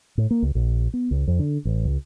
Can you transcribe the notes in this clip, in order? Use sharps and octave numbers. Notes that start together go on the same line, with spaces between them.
A2
A#3
C#2
A#1
B3
C#2
F2
D3
A1
C#2